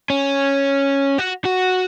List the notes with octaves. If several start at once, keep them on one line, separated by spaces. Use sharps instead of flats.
C#4
F#4
F#4